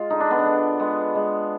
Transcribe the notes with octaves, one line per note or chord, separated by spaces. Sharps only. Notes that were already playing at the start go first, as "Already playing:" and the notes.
Already playing: G#3 F4
D3 D#4
D4
B3
D4
D3
G#3 B3
G#3